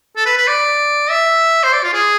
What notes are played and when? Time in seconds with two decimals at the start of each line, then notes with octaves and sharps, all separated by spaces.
0.16 A4
0.26 B4
0.37 B4
0.47 D5
1.10 E5
1.63 C5
1.73 D5
1.84 F4
1.93 G#4